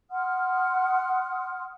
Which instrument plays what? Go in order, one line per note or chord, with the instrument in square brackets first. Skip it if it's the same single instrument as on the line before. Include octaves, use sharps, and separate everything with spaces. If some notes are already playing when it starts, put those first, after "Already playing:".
[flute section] F#5 C6 D#6 F6